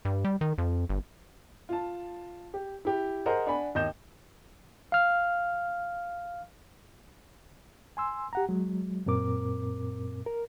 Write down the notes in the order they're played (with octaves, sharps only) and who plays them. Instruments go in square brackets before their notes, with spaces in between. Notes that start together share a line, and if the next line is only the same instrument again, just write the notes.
[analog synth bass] G2
G3
D#3
F2
G1
[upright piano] F4 A5
G4
E4 G4
G#4 A#4 C5 D#5 F#5
D4 F#5 G#5 B5
D#2 D#5 G6 E7
[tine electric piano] F5 F6
[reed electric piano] G#5 C6 E6
G4 F#5 A#5
F#3 G#3
F#2 A#2 C4 A#4 D6
A#4